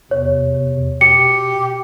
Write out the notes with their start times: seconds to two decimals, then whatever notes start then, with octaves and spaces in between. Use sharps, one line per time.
0.11 E2 C3 C#5
1.01 B2 G4 C#7